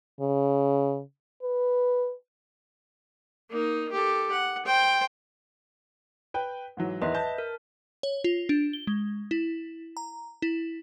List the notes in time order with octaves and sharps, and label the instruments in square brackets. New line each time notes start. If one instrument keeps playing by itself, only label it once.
[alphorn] C#3
B4
[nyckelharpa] A#3 D#4
G4 A4
F#5
C5 G5
[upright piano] B4 G5
G#2 E3 F#3
[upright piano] E2 D#3 C6 [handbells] B4 D#5 E5
[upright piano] A5 G6
[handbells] A#4
[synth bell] C#5
F4
D4
G7
G#3
E4
A#5
E4